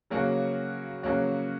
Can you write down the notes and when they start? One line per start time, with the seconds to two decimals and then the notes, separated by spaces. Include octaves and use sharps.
0.10 C#3 F#3 A#3 C#4 F#4
1.03 C#3 F#3 A#3 C#4 F#4